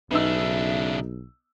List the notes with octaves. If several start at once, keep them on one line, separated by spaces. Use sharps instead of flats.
B1 C#3 B3 D4 D#4 E5 E6